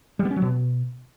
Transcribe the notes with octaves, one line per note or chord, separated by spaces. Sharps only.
G3
B3
C#4
F#3
B2